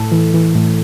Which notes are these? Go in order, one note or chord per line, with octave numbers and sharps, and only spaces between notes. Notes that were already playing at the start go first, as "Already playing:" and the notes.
Already playing: A2 A4
E3
E3
A2